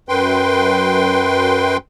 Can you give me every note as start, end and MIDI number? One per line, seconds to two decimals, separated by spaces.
0.09 1.77 42
0.09 1.77 71
0.09 1.77 79
0.09 1.77 84